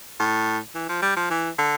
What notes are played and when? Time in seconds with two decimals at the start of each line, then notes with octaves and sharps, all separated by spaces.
0.20 A2
0.75 E3
0.89 F3
1.02 G3
1.17 F3
1.31 E3
1.58 D3